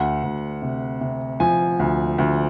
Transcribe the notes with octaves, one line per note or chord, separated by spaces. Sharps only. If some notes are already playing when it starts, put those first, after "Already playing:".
Already playing: D2 F#5
D2
C3
C3
F3 G#5
D2
D2